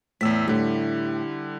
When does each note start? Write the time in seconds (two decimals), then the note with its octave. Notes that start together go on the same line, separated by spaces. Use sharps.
0.21 E2 A2 E6 B6
0.48 A2 D3 G3